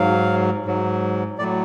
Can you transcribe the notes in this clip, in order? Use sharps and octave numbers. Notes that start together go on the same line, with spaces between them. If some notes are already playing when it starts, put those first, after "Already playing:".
Already playing: G#2 F#3 F5
G#2 F#3
A2 F#3 D5